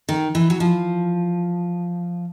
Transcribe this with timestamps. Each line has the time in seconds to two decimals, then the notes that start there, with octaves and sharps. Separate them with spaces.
0.09 D#3
0.35 E3
0.50 F#3
0.60 F3